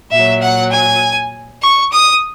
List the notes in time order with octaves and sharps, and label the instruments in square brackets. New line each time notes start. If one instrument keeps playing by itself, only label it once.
[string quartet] A#2 F#3 E5
F#5
G#5
C#6
D#6